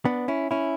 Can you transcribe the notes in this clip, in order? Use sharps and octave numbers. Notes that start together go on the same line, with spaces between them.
B3 D4
C#4 E4
C#4 E4